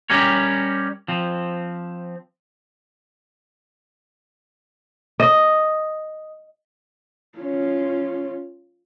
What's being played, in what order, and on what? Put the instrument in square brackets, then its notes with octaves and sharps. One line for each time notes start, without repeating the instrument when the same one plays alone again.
[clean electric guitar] G3 C#4 G4 A#4 C#5
F3 C4
[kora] D#5
[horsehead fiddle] C#4 F4